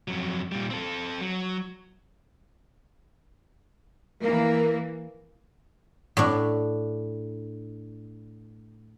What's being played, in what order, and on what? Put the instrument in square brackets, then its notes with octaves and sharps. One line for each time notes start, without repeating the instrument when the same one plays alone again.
[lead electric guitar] F2 F#3
A#2 G3
C4 A4
F#3
[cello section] E3 A#3 [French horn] A#4
[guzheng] A2 D4